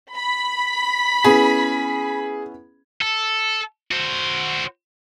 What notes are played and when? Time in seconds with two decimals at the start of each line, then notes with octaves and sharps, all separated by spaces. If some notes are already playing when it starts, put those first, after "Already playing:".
0.14 B5 B6
1.24 B3 C#4 E4 G#4
3.02 A4
3.92 F#4 C5